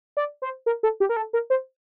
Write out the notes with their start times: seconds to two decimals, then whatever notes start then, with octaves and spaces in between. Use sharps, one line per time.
0.17 D5
0.42 C5
0.66 A#4
0.83 A4
1.00 G4
1.09 A#4
1.17 A4
1.33 A#4
1.50 C5